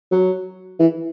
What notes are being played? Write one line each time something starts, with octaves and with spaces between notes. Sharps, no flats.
F#3
E3